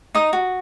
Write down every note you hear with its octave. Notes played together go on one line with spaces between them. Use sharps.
D#4 D#6
F#4